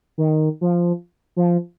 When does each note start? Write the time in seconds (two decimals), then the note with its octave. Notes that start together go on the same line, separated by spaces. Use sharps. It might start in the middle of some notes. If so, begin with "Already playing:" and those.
0.18 D#3
0.61 F3
1.36 F3